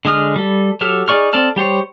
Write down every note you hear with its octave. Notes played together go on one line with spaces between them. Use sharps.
D3 G#3 D#6 F6
G3 A4
F#3 G4 A4 F6
D#4 G#4 D5 C#6 F6
C4 A4 D5 A5 F6
G3 G4 C5 C#5